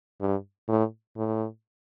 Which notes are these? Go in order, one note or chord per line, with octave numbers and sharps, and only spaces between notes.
G2
A2
A2